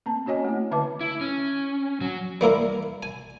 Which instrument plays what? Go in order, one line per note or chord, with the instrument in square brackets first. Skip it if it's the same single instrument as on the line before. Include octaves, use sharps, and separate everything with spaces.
[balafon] A#3 C4 A5
C#4 F#4 C#5 D#5 G#5
A3 E4
D3 B4 E5 A5 D6
[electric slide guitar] E4
C#4
F#3
[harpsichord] G3 A#3 E4 A#4
G#5